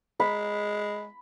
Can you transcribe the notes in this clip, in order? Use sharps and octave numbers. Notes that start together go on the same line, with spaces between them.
G#3 B5